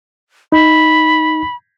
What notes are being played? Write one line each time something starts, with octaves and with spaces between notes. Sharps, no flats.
D#4 B5